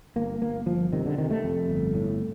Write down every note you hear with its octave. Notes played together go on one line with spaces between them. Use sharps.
G1 A#3
G1 A#3
G1 F3
C3 D#3
D3
C3 D#3
A3
F2
G1
A2